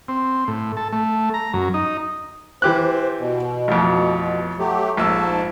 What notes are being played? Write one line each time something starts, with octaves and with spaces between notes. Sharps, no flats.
C4
A2
A4
A3
A#5
F#2
D#4
E3 G4 C5 F#6
B2
A1 F2
F#3 A3 G4
A#1 G#2 A5 E6